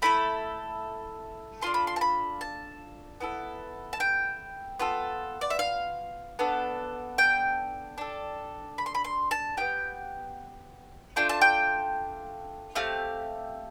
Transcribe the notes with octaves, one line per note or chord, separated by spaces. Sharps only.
A3 E4 A4 B5
D4 F4 A4 C6
B5
C6
A5
B5
A5
B3 E4 A4
A5
G5
B3 F4 A4
D5
E5
F5
B3 D4 A4
G5
D4 A4
B5
C6
B5
C6
A5
B3 D4 G4 G5
A3 D4 F4 G5
A5
G5
A3 C4 G4 F5